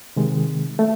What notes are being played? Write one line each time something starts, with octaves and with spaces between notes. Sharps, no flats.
C3 D#3 G#3
A3